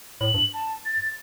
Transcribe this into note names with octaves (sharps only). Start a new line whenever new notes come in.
A2 F#7
G2
A5
A6